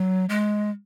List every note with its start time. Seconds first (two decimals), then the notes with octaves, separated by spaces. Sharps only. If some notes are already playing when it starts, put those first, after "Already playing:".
Already playing: F#3
0.29 G#3